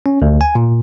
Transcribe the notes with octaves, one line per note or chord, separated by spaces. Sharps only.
C#4
D2
G#5
A#2